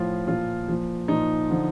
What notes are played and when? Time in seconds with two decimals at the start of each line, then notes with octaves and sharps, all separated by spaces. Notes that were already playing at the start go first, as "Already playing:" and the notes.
Already playing: A2 F3 F4
0.27 A#2 F3 F4
0.68 A#2 F3
1.08 A#2 F3 D#4
1.50 D3 F3